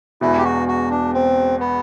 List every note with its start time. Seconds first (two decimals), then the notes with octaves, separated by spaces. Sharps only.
0.21 E1 E2 B2 E4
0.38 G4
0.44 F#4
0.68 F#4
0.91 D4
1.14 C4
1.60 B3